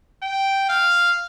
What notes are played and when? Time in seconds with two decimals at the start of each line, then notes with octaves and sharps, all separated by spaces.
0.23 G5
0.69 F5